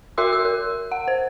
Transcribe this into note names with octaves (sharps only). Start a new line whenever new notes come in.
F#4 A#4 E5 C6 E6
E6
A#4
F#5
C5